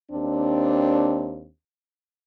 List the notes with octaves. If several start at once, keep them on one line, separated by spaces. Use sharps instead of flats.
D#2 C4 D4